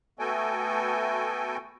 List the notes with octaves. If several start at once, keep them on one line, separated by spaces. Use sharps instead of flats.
A3 B3 F#4 A4 G5 G#5